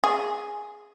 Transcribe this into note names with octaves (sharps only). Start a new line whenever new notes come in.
G#4